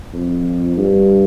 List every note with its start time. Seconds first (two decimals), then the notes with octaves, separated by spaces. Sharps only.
0.14 F2
0.78 G2